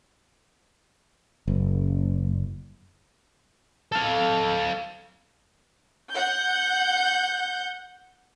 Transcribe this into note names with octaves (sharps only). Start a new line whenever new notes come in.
F#1
A4 F5
F#5 G6